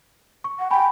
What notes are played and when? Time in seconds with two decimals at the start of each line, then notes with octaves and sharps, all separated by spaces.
0.44 C#6
0.59 F#5
0.71 G5 G#5 B5